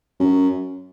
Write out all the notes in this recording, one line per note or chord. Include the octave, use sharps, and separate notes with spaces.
F#2